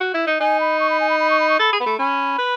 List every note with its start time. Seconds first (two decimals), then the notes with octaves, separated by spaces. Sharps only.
0.01 F#4
0.14 E4
0.27 D#4
0.41 D#4 G#5
0.60 B5
0.80 C#6
0.90 B5
1.00 G#5
1.10 B5
1.20 B5
1.30 C#6
1.40 B5
1.50 C#6
1.60 A4 B5
1.73 G#4
1.80 B3 B5
1.86 A3
1.99 C#4 B5
2.39 B4